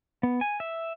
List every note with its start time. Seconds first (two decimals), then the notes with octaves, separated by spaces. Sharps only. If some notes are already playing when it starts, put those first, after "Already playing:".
0.23 B3
0.41 G#5
0.60 E5